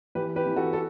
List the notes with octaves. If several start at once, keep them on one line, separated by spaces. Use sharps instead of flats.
E3 G4 B4
G4 B4
E3
F#4 A4
A4